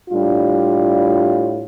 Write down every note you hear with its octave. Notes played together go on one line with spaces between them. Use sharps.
A2 G3 D4 F4